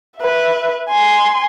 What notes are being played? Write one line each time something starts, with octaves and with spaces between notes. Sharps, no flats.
B4 E5
G#5 C6